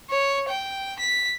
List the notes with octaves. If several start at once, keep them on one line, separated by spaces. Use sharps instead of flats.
C#5
G5
B6